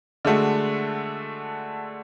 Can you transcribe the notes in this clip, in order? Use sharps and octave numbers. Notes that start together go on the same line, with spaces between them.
D3 G#3 A3 F#4